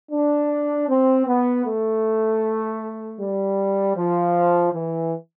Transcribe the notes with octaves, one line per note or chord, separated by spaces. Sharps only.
D4
C4
B3
A3
G3
F3
E3